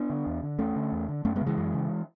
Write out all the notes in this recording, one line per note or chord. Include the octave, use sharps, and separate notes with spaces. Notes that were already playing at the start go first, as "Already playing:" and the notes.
Already playing: B3 D4
D3
E2
D3
E2 A3 C#4
D3
E2
D3
F#2 A3 C#4
G#3 B3
C#3
E3 G#3
F#2
C#3